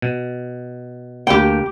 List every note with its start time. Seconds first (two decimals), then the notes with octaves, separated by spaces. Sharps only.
0.02 B2
1.27 D2 A#3 G4 G5